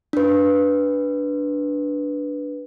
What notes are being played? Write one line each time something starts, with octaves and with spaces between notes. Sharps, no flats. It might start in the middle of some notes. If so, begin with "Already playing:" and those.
D4 B4